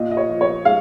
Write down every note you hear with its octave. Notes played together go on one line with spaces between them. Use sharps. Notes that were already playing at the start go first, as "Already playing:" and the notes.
Already playing: A#2 D#5
D#5
C#5
F3
C#5
G#3 F5